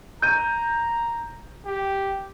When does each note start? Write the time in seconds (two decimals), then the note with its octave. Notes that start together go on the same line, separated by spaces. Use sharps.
0.22 A#5 G6 D#7
1.66 G4